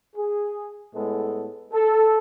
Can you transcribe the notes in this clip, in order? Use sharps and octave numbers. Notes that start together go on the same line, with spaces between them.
G#4
A2 G#3 B3 A4
A4